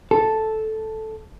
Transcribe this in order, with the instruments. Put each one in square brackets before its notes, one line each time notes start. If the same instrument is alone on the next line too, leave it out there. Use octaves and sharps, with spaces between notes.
[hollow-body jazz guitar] A4